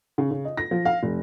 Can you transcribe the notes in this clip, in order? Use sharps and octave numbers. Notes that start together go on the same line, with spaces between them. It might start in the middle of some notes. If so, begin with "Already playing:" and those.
C#3
C#3
D#5
A#6
F3
F5
F1